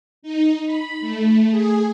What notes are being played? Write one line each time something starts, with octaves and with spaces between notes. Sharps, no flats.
D#4
B5
A3
G#4